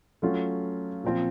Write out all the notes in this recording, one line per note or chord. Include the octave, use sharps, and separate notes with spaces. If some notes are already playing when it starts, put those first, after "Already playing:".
F#3 A3 C#4 F4
A#2 F3 C4 F4